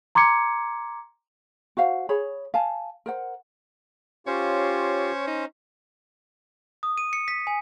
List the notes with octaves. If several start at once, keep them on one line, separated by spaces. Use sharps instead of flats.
A#5 C6 D6 G#6 C#7
F#4 C5 F5 F#5
G#4 C#5 B5
F5 G#5 A5
A#4 C5 F#5
C#4 F4 G4 C5 C#5 F5
D#4
D#6
D#7
C#7
B6
G#5